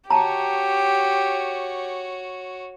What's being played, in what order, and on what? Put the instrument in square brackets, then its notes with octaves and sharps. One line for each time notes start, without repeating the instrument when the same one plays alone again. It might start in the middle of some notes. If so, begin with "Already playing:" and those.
[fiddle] F#4 C#5 [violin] G4 [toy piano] A5 A#5